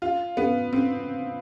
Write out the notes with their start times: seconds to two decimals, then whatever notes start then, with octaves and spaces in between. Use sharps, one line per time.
0.02 F4
0.37 B3
0.73 C4